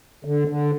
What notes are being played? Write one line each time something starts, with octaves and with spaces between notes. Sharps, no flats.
D3
D3